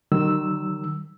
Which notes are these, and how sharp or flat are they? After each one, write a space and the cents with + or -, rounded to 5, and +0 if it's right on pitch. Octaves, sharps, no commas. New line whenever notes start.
D#3 -30 F#3 +45 E6 +0